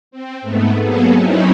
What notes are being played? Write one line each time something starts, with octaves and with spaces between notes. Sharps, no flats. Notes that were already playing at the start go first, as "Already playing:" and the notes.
C4
G#2 A3 B3
F#3 A#3 B3 G#4 A4
F#3 C4 C#4 D#4 E4